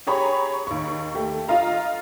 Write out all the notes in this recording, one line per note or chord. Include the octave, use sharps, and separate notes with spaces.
G4 G#4 C#5 A#5 B5 C#6
D#2 C#6
A3 G4
F4 D#5 F5 A#5